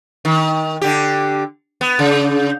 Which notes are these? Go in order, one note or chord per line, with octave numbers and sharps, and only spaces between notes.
D#3
D3 G4
B3
C#3